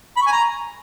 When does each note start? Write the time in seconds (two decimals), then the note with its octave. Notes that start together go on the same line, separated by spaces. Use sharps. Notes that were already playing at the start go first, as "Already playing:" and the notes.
0.17 B5
0.22 C#6
0.27 G#5
0.32 A#5